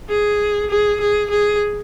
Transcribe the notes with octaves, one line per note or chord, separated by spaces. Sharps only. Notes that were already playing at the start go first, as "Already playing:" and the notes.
G#4
G#4
G#4
G#4